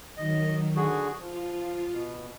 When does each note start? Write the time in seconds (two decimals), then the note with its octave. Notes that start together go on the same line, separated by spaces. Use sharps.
0.17 D#3 F#3 D#5
0.76 D3 F#4 G#4
1.19 F3 F4
1.91 B2